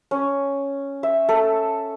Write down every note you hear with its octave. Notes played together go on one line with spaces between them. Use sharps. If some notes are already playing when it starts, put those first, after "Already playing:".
C#4
E5
A4